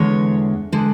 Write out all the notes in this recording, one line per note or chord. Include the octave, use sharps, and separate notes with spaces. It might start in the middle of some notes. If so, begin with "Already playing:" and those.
Already playing: E2 D3 G#3 C#5
D3 G#3